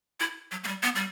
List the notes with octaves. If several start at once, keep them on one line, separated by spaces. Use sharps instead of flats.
E4
F#3
A#3
G3
B3
G3